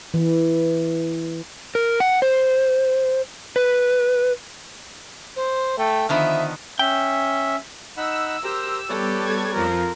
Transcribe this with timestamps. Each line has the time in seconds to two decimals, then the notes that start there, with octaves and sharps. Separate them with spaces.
0.14 E3
1.75 A#4
2.00 F#5
2.22 C5
3.56 B4
5.36 C5
5.78 A3 G5
6.09 D3 D#3 F3 B3 E5
6.79 C#4 E5 G5
7.97 D#4 F#5 B5 E6
8.43 G4 A#4 C5 A#5
8.89 G3 B3 G4 A4 B4 C#5 D5
9.25 G#6
9.55 F2 F3 A#4